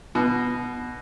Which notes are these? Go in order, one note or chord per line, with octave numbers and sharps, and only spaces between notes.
B2